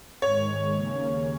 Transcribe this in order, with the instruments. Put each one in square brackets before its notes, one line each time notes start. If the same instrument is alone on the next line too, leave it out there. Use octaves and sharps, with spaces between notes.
[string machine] G#2 D#3 G#3 [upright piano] C#5
[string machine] D#2 C#3 A#3 C#4